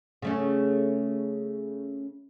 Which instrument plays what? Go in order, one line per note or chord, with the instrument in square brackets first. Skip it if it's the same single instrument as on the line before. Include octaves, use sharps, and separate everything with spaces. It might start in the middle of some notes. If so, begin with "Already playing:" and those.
[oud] C#3 A3 C#4